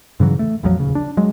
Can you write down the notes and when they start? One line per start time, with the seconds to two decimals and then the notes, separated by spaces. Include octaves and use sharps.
0.20 G2 C#3 E3 F#3
0.39 A3
0.63 A#1 F2 F3 F#3
0.77 D#1 C#3
0.95 D4
1.17 F#3 G#3